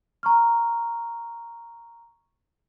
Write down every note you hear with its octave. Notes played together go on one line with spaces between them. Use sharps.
A#5 C#6 F6